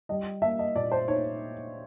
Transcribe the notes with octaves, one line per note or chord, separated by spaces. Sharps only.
G3 D#5
A#3 E5
D#5
A#2 D5
C5
D#4 C#5